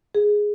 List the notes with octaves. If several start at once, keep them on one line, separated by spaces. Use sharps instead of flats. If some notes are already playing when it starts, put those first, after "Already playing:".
G#4